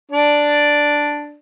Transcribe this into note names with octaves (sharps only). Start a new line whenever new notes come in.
D4 D5